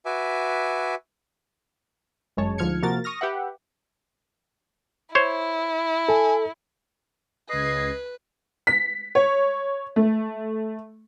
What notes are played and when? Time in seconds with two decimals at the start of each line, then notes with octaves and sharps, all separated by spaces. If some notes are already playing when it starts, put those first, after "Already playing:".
0.06 F#4 B4 E5 G#5 D6
2.37 G1 F#2 G#3 C#5 A5
2.58 D2 G#2 F3 F6 G#6 C#7
2.83 C3 F3 A#3 F#4 A#4 A6
3.04 C#6 D#6 F6 A#6
3.21 G4 B4 E5 F#5
5.15 E4 C5 C#5
6.09 A4 G#5
7.49 C#2 B4 D#5 G#6 C7
8.67 B6
9.15 C#5
9.96 A3